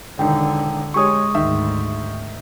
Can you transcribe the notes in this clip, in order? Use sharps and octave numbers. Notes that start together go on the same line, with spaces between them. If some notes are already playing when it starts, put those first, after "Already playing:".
E1 D3 D#3 G5
G#3 G4 G#4 C#5 C#6 D#6
D2 G#2 D#3 E5